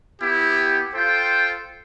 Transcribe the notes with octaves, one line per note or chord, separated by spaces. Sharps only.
B3 E4 G4
F4 A4 C5 G5